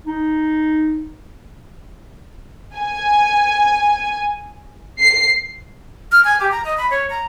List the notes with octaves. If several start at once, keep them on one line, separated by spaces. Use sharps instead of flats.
D#4
G#5
C7
F6
G#5
G4
A#5
D#5
B5
C#5
A#5